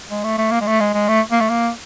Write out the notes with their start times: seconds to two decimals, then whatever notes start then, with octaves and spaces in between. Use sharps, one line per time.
0.10 G#3
0.24 A3
0.38 A3
0.51 A#3
0.61 G#3
0.67 A3
0.80 G#3
0.94 G#3
1.08 A3
1.31 A#3
1.40 A3
1.50 A#3